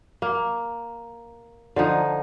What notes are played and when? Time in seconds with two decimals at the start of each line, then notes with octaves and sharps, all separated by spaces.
0.22 A#3
1.76 D3 F3 D#4